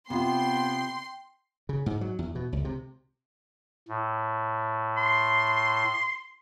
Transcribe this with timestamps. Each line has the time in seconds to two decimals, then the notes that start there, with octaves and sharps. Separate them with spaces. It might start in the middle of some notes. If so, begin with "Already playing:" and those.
0.10 C3 B3 F4 G5 C6
1.69 C#3
1.86 G#2
2.01 F#3
2.19 E2
2.35 B2
2.53 C#2
2.65 C3
3.88 A2
4.97 C6